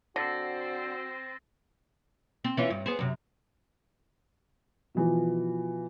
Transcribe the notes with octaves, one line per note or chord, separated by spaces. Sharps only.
D3 C4 F#4 C5 E6 A6 A#6
C4
E3 C#4 F4
G2
B3 G#4 C5
F#2 C3
B2 E3 F3